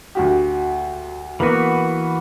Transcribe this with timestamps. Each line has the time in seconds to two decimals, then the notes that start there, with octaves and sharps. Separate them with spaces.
0.15 D2 F#4 G4
1.40 E3 A#3 B3 F#4 B4